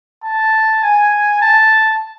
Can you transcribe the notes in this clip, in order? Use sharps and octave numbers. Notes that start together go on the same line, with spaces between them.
A5
G#5
A5